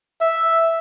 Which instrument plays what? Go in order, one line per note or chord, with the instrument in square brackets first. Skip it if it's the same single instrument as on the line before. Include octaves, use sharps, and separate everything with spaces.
[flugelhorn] E5